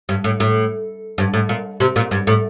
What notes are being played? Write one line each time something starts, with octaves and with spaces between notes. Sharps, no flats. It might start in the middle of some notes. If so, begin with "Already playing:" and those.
G2
A2
A2
G2
A2
A#2
C3
A#2
G2
A2